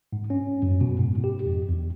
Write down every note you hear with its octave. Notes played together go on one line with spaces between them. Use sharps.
G#2
C#4
F#2
B2
G#2
G4
F2
E2